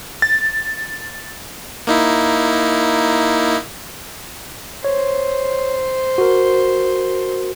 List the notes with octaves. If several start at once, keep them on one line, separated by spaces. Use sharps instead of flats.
A6
A#3 D#4 E4
C5 C#5
F#4 A#4